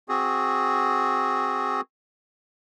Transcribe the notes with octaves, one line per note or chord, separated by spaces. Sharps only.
C4 F#4 G#4